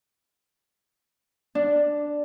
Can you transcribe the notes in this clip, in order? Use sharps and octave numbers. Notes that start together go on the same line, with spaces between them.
D4